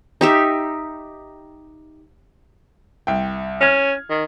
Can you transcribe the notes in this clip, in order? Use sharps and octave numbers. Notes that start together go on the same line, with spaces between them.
D#4 G4 E5
C2 G5
C#4 F6 G#6
D#3